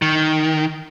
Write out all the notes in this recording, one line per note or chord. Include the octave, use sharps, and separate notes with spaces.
D#3